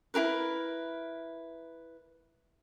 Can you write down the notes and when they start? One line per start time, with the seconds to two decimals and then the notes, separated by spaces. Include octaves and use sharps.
0.14 E4 G#4 A#4 B4